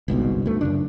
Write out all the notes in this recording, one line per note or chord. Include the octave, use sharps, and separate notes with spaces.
G1 C2 G#2 B2
D2 A3
F#2 C#3 D4